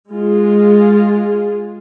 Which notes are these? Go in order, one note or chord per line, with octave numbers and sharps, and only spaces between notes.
G#3 F4 G#4